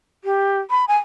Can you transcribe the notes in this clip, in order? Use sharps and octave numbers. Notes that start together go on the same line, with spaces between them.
G4
B5
G#5